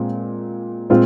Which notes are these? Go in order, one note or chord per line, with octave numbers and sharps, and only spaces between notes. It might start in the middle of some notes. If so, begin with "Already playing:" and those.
Already playing: A#2 G#3 C4
A#2 G#3 C4 F4